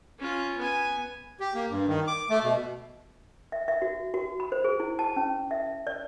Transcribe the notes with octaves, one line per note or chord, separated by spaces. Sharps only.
C#4 F4
B3 G#5
G4
A#3
G2
D#3
D6
A3
B2
E5
E5
F#4
F#4
B5
C5
G#4
E4
A5
C#4
E5
D5